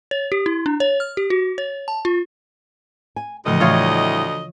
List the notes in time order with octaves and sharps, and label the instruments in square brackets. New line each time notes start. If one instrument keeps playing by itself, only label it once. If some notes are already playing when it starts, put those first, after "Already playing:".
[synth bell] C#5
G4
E4
D4
C#5
F6
G4
F#4
C#5
A5
F4
[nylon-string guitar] G#5
[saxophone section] D2 D#5 [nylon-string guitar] A2 [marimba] C#3 E3 F3
[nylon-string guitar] A2 G3 E5 [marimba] E3 [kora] F4 C#5